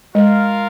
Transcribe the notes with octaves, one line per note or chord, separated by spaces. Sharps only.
G#3 F4 A#4 F5